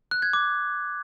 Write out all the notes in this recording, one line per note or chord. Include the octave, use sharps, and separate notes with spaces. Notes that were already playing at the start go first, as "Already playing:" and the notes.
F#6
G#6
D6